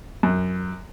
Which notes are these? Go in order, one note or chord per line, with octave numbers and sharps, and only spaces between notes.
F#2